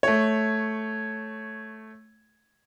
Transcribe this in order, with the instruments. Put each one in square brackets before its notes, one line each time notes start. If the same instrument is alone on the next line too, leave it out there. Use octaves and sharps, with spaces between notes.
[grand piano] A3 C#5